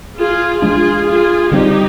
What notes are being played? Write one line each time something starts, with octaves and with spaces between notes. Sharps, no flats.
F4 G#4
F3 G#3 D4 F4 G#4
F4 G#4
D3 G3 C4 D#4 G4